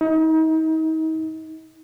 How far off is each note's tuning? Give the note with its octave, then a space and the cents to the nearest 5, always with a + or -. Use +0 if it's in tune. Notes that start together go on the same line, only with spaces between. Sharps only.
D#4 +35